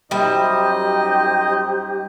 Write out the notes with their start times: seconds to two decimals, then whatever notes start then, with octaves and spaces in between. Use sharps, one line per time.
0.11 F#2 G3 D#4 G4 C5 D#5 E5